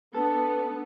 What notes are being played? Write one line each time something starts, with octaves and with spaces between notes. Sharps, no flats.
B3 D4 A4